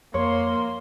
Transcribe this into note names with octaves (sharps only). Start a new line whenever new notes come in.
F2 A#3 C#5 C6